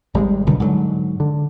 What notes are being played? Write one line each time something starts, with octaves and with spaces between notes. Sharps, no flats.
G#1 G3 G#3
B1 B2 D3 D#3
G#2 D3 D#3 F#3
D3